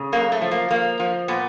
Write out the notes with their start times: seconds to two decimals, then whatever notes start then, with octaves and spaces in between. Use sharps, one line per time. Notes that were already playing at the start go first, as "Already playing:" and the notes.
Already playing: C#3
0.12 F#2 A#3
0.32 A3
0.42 F3
0.51 A#3
0.70 F3 A#3
1.00 F3
1.28 A#2 B3